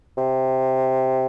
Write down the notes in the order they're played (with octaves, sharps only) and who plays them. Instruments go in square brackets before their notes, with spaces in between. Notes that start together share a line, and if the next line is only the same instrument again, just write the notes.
[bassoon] C3